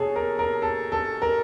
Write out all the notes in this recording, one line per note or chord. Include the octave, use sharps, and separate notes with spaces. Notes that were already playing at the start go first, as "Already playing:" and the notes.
Already playing: B2 G#4 A4 C#5
A#4
A#4
A4
A4
A#4